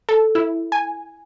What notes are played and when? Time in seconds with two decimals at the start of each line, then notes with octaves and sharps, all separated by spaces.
0.09 A4
0.35 E4
0.72 G#5